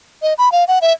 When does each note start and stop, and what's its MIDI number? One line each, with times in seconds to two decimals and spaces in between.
0.22 0.34 75
0.38 0.52 83
0.52 0.64 77
0.68 0.79 78
0.82 0.93 76